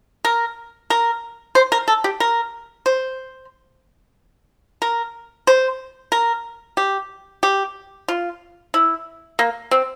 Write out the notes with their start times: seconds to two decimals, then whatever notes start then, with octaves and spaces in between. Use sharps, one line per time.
0.25 A#4
0.90 A#4
1.55 C5
1.72 A#4
1.88 A4
2.04 G4
2.20 A#4
2.86 C5
4.82 A#4
5.47 C5
6.12 A#4
6.77 G4
7.43 G4
8.08 F4
8.74 E4
9.39 A#3
9.71 C4